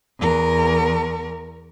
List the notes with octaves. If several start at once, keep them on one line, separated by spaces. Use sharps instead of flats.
E2 A#4